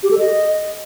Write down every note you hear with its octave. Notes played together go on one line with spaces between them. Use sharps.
G4
A4
D#5